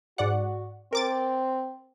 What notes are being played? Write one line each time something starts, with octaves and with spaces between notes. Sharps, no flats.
G#2 F#4 D5 F#5
C4 A#4 D6 A6